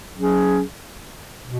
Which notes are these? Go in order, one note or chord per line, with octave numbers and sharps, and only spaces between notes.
F#3 C#4 G#4
B2